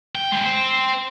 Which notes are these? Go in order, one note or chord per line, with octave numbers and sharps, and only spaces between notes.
G5
G#3 G4
C5 G5